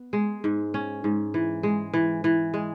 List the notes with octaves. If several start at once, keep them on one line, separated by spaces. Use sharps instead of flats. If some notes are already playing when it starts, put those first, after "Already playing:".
Already playing: B3
G#3
G#2
C#4
G#2
E3
G#3
E3
E3
G#3